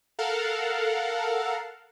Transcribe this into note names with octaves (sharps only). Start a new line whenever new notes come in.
A4 A#4 F5 F#5